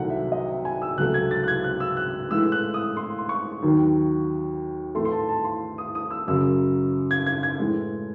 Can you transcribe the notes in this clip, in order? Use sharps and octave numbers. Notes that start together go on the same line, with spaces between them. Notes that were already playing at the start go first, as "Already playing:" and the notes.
Already playing: C2 C3 D#3 F#3 A3 F#5
E5
D#5
E5
G#5
E6
C#2 C3 F#3 A3 F#6
G#6
A6
F#6
G#6
F#6
E6
F#6
A2 E3 G#3 E6
F#6
D#6
C6
C6
C#6
D#2 D#3 F#3
A2 E3 A3 C6
C6
A5
A5
C6
D#6
D#6
E6
F#2 C#3 F#3 E6
G#6
G#6
G#6
A2 E3 G#3